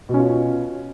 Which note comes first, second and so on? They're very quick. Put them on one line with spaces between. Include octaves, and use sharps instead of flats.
B2 C#4 F4